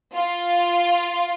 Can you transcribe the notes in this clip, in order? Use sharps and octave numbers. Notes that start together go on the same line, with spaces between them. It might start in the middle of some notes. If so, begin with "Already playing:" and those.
F4